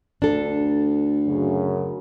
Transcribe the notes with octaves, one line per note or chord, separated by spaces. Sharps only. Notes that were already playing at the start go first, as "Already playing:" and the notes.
D2 D4 A4
F#2 C#3